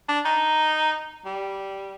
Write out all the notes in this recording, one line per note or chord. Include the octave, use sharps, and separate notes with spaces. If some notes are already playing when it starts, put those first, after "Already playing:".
D4
D#4
G3